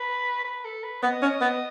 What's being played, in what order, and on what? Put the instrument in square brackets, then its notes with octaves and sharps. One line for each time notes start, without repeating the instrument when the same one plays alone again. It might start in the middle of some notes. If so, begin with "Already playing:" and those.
Already playing: [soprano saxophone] B4
B4
A4
B4
[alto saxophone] B3 [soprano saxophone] D#5
[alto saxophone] C#4
B3